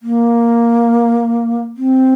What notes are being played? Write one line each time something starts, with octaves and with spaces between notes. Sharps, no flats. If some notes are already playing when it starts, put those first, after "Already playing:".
A#3
C4